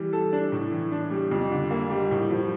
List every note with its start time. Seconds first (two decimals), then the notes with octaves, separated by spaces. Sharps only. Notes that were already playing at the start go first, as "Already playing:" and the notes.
Already playing: E3 G3
0.13 A4
0.33 D4
0.52 A2
0.72 E3
0.92 D4
1.11 G3
1.31 F2
1.52 D3
1.71 A#3
1.90 G3
2.11 A2
2.31 F3